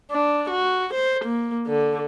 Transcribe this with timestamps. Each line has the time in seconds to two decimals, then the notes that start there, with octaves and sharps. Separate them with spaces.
0.11 D4
0.50 F#4
0.94 C5
1.25 A#3
1.68 D3